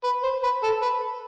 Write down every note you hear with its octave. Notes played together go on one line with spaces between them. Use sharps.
B4
C5
B4
A4
B4